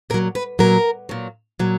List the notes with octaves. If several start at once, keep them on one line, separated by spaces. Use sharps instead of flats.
A#2 F#3 A#4
B4
A#2 F#3 A#4
A#2 F#3
A#2 F#3